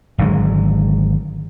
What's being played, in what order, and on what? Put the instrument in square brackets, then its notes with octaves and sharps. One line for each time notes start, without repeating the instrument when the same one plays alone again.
[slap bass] G#1 D3 F#3 G#3